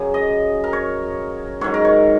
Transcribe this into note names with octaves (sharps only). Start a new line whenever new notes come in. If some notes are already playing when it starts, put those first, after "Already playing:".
Already playing: F#2 C#3 F#3
D#5
A#4
C#5
G#2 D#3 F#3 C#5
A#4
C#5